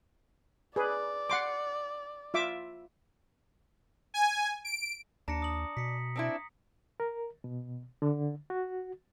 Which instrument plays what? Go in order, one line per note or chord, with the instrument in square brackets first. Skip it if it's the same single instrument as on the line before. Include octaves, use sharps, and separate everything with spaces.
[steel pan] G#4 B4 [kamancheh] D5
[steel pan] F#5 C6 D6
F4 E5 D6
[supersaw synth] G#5
D7
[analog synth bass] D#2 [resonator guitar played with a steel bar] D4 [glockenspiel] A#5 A#6 C#7
[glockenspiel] D#6 F#7
[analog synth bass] B2 [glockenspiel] B6 C#7
[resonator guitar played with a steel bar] C4 D4 E4
[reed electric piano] A#4
B2
D3
F#4